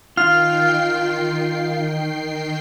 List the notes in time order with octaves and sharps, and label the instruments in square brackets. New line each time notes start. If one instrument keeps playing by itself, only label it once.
[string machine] D#3 G5 C7 [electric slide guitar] F4 [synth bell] F6